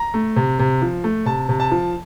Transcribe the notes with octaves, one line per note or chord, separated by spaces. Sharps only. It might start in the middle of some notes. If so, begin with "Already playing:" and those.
Already playing: A#5
A3
C3
C3
F3
A3
C3 A5
C3
A5
F3